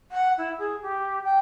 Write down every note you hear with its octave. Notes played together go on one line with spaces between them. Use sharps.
F#5
E4
G#4
G4
G5